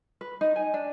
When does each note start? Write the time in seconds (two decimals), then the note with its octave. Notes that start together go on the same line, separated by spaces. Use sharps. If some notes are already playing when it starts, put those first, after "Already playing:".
0.21 B4
0.41 D#4
0.56 G#5
0.74 D4